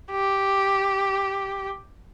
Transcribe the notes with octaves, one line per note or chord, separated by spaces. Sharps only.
G4